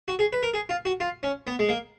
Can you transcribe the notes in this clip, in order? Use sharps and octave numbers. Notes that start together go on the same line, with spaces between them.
F#4
G#4
B4
A#4
G#4
F4
F#4
F4
C#4
B3
G#3
A#3